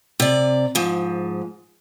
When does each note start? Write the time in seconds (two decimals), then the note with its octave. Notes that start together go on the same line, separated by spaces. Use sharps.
0.20 C3 D5
0.75 G#2 F3